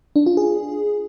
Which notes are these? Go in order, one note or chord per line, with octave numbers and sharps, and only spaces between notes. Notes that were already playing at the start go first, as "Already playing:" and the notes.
D4
F4
G#4